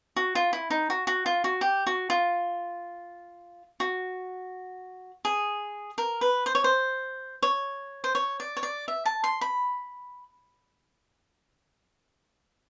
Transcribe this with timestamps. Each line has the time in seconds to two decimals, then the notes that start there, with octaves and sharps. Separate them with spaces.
0.16 F#4
0.35 F4
0.53 E4
0.70 D#4
0.90 F#4
1.07 F#4
1.26 F4
1.44 F#4
1.61 G4
1.87 F#4
2.10 F4
3.80 F#4
5.25 G#4
5.98 A#4
6.21 B4
6.46 C5
6.55 C#5
6.64 C5
7.43 C#5
8.04 C5
8.15 C#5
8.40 D5
8.57 C#5
8.63 D5
8.88 E5
9.05 A5
9.24 C6
9.41 B5